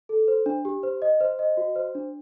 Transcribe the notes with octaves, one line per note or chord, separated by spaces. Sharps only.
A4
C5
D4
G4
C5
D#5
C5
D#5
F#4
C5
D4